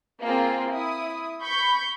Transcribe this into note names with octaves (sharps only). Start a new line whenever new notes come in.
A#3 C4 F4 G#4
E4 D#6
B5 C#6 G6